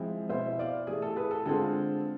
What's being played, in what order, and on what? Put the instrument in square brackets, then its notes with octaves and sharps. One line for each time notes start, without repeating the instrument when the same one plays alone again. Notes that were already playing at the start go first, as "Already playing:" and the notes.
Already playing: [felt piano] F3 G#3 C4 E4
B2 B3 E4 C5 E5
D5 F5
C3 E3 A3 G#4
A4
G#4 B4
A4
D3 G#3 C4 F4 A4